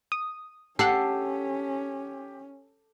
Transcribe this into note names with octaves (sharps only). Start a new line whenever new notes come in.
D#6
C#4 G4 A4 F#5 C7